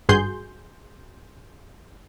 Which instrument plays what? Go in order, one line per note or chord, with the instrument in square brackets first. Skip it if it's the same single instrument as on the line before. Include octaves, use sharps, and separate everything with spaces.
[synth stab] G#1 G2 F#4 G#4 C6 G6